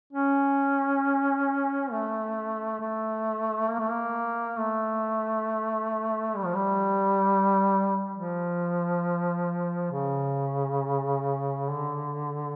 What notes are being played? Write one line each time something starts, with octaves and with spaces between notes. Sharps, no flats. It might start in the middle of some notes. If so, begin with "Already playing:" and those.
C#4
A3
A3
A#3
A3
A#3
A3
G3
F3
G3
F3
C#3
D3